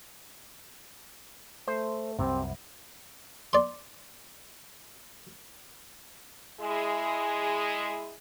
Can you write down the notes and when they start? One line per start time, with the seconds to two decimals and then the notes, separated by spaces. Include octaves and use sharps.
1.67 A3 C5
2.19 C2 F#2 C3 C4
3.53 D5 C6
6.60 G#3 E4 G#4